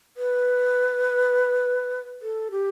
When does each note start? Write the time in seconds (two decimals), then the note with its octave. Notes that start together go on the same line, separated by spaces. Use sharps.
0.17 B4
2.22 A4
2.51 G4